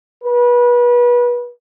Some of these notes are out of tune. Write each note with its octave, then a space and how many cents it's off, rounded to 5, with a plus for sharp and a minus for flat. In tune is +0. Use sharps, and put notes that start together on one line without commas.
B4 -30